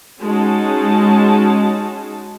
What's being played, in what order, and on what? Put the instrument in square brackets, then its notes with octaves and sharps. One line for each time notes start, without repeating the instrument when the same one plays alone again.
[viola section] G#3 C#4 D#4 F#4 A5